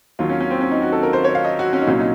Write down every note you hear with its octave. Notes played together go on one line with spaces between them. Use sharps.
D#2 D#3 F#3 F4
C#4
C#4
C4
C#4
D#4
F#4
A4
A#4
C5
C#5
F5
D#5
F#4
C#4
D#4
C2 A#2 F#3 C#4
D#4